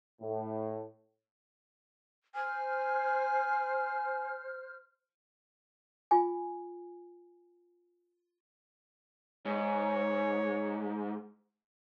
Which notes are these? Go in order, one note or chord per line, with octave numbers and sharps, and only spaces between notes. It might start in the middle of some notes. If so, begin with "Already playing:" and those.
A2
C5 G#5 F6
F4 G#5
G#2 C#5